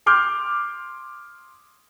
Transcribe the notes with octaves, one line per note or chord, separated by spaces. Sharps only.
C6 D6 F6 G6